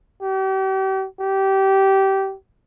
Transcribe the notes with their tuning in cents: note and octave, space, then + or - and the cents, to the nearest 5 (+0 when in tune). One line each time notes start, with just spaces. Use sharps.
G4 -40
G4 -20